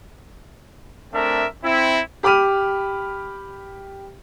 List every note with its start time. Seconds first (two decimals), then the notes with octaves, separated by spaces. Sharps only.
1.14 A3 C4 D4 A#4 E5
1.64 C4 E4
2.23 G4 B5 D6 F6 D#7